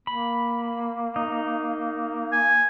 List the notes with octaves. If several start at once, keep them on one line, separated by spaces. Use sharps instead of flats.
A#3 B5
D#4
G#5